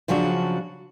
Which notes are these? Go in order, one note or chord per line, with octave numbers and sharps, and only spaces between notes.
C#3 F3 F#3 D4 F#4